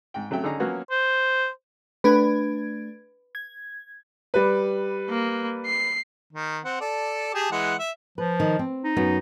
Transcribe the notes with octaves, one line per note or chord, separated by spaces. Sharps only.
G#2 G5
C#3 F#3 A3 E5 G5
D3 C#4 D#4 G#4 A#5
F3 F#3 A#3 B3 C#4 F#4
C5
A3 D4 B4 G#6
G#6
G3 B4
A#3
C7
D#3
C4 F#5
A4 D5
G4 G#4 A5
E3 G#3 F#5
E5
F3 B4
D#3
C4
D#4
F#2 B3